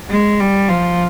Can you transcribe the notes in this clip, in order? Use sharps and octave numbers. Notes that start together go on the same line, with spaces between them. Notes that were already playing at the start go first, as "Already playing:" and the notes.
G#3
G3
F3